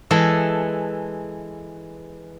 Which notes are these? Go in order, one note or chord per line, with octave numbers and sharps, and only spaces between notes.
E3 G#3 A4